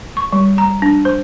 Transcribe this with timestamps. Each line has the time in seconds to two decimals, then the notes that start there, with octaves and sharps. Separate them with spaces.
0.17 C#6
0.33 G3
0.58 A#5
0.82 D4
1.05 C5